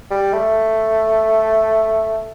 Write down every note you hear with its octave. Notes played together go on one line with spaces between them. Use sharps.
G3
A3